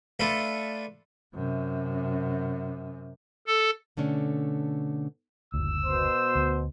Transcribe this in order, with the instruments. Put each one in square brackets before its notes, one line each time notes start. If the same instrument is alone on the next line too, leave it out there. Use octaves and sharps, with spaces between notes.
[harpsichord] A3 D4 F4 A4 B4
[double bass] F#2 C3
[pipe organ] A4
[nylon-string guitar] B2 D3 A3 C#4 D4
[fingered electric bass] F#1 D2 [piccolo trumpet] E6
[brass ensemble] B2 C5
[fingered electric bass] D2